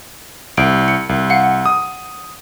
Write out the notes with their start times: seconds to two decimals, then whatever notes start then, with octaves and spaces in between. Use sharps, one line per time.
0.57 C2 D7
0.88 C#7
1.09 C2
1.30 F5 F#5
1.66 D#6